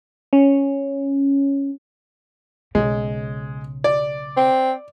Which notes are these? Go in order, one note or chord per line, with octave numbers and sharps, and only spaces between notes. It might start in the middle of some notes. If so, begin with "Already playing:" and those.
C#4
B1 C#3 G#3
D5
C4